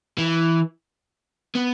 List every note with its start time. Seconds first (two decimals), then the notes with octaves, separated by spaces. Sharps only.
0.18 E3
1.55 B3